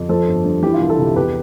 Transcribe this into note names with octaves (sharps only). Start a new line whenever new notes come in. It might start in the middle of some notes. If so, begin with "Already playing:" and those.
Already playing: F2
F3 A4 C5
G1
G2
E3 E4 G4
F4
C2 G4
F4 A4
C3
E2 G4 B4